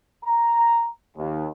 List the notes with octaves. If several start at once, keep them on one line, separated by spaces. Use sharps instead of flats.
A#5
D#2